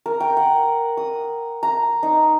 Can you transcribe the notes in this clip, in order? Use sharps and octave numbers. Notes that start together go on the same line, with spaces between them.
A#4
G5
F#5
D#6
A#5
D#4